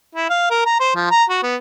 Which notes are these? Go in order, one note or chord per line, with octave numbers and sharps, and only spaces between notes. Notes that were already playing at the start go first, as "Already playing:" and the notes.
E4
F5
A#4
A#5
C5
F3
A#5
F#4
B3